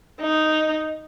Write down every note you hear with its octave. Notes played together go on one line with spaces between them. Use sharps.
D#4